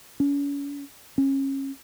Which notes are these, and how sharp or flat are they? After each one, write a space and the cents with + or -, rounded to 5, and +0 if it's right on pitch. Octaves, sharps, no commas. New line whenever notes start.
C#4 +40
C#4 -30